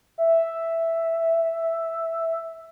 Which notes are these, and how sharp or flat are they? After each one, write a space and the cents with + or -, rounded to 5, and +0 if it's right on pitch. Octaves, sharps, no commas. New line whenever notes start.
E5 +0